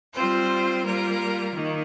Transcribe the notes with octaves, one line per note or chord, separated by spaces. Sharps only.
G3 C4 F4 C5
G3 A#3 F4 A#4
D#3 A#3